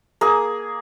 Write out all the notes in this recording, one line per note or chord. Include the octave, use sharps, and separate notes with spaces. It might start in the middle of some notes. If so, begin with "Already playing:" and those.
A#3 G#4